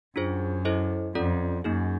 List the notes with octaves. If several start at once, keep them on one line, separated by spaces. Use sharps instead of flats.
F#2 D4 F4 G#4 C5
E4 A4 C5 D#5
F2 C#4 F4 A4 D5
F#2 A#3 D#4 G#4